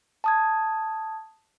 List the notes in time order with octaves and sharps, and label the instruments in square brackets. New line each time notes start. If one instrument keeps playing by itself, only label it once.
[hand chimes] A5 D#6 G#6